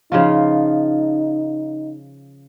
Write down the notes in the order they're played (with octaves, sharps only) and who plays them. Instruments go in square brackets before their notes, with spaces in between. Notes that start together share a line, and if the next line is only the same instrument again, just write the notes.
[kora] C#3 F3 F4 [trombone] D#4